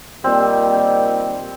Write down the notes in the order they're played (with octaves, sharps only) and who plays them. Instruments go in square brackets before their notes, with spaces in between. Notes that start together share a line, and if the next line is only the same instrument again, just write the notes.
[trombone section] A#2 D#3 G3 [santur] C4